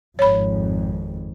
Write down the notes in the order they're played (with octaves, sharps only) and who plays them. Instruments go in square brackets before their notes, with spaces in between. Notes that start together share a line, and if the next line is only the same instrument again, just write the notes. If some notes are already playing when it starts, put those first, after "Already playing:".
[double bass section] G#1 F2 [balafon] C#5 B5